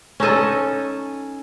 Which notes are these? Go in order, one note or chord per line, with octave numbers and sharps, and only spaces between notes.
C#4 D#4 A4 D#5